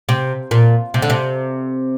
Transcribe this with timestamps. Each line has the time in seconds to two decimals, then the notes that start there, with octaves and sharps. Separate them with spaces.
0.09 C3
0.51 A#2
0.94 C3
1.02 D3
1.10 C3